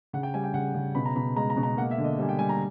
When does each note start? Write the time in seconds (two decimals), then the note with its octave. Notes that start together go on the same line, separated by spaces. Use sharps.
0.13 C#3 F#5
0.23 G5
0.34 G3 G#5
0.44 G5
0.54 C#3 F#5
0.74 C#3
0.95 B2 B5
1.05 A#5
1.16 B2 B5
1.36 G#3 A#5
1.50 A#5
1.57 B2
1.63 A#5
1.77 A#3 F#5
1.91 E5
1.98 D3
2.04 D#5
2.19 G3 G#5
2.29 G5
2.39 G3 G#5
2.49 A#5